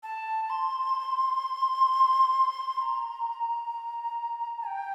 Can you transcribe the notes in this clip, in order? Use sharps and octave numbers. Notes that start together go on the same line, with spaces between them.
A5
C6
A#5
G5